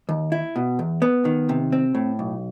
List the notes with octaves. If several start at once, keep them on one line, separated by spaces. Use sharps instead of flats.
D#2
E4
B2
E2
B3
D#3
C3
C4
A2
B1